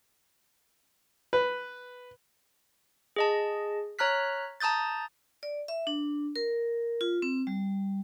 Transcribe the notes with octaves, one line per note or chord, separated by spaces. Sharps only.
B4
G#4 D#5 A5
C#5 A#5 F6 F#6 B6
A5 A#5 D#6 G6 A6
D5
E5
D4
A#4
F4
C4
G3